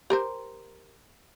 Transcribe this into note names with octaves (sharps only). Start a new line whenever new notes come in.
G4 A#4 C5